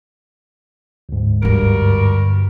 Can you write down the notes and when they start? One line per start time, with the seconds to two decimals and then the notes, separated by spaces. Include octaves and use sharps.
1.09 D2 G#2
1.42 G2 D3 G3 F#4 A#4